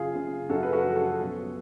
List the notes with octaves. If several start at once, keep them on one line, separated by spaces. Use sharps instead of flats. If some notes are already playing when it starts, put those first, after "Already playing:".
Already playing: F#1 F4 G#4
C#3
F#2 F#4 A4
B4
F#4 A4
F3
F#4 A4
B1